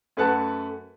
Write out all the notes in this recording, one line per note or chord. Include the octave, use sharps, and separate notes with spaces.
F#2 A3 B4 F#5 A5